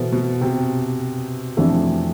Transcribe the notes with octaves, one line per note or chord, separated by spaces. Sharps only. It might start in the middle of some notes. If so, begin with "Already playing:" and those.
Already playing: B2 E3 B3 E4 A4 C5
B2
C3
F2 E3 A3 D4 A4